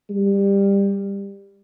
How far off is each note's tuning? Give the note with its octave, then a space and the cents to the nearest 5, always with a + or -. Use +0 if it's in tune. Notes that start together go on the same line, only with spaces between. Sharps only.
G3 +20